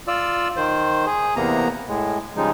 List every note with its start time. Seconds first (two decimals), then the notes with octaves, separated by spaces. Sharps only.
0.08 F4 D5 E6
0.57 D#3 C5
1.06 G#4
1.36 E2 C3 A#3 B3 A#5
1.88 A2 G#3
2.37 C#3 F3 G3 G#3 D#4